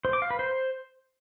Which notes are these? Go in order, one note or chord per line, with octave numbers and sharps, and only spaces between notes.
C5
D6
F5
B4
C5